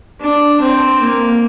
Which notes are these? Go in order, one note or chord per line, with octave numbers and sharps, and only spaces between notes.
D4
C4
A#3